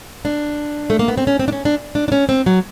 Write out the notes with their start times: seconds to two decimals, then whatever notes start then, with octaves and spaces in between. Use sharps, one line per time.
0.25 D4
0.90 A3
0.99 A#3
1.08 B3
1.18 C4
1.27 C#4
1.39 C4
1.48 D4
1.52 C#4
1.65 D4
1.95 D4
2.08 D4
2.12 C#4
2.29 C4
2.46 F#3